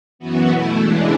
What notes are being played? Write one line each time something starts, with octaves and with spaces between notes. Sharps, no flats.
F#2 E3 B3 F#4
B2 A3 E4
E2 C#3 E3 G#3 D4